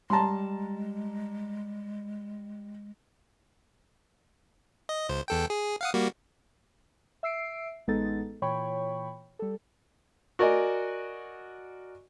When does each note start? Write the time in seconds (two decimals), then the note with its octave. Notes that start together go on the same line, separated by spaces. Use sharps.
0.10 G3 G#3 A5 A#5 C6
4.89 D#5
5.09 C#2 C5
5.28 E2 A4 G5
5.50 G#4
5.81 F5 F#5 D#6
5.94 G3 A#3 F#4
7.23 E5 E6 C7 D7
7.87 A1 G#3 B3 D#4 A4 A6
8.42 A#2 E3 C#5 G5 B5 C#6
9.39 G3 A4
10.39 F#4 A#4 D5 D#5 G#5